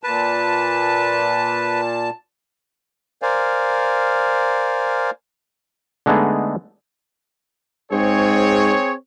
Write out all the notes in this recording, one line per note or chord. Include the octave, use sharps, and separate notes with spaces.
A#2 B4 A5
A#4 C5 D5 F5 G#5
D3 G#3 A3 B3 D#4 G#4
G#2 C4 G#4 C#5